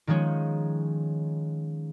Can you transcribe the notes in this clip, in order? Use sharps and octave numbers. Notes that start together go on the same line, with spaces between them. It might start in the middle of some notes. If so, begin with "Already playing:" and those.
D#3 F3 G#3 C#4 C#5